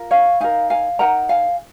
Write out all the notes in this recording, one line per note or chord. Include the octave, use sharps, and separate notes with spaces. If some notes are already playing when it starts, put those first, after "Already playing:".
Already playing: F4 A#4
C#5 F5
D#4 A#4 F5 G#5
F5 G#5
D#4 A#4 F#5 A#5
F5 G#5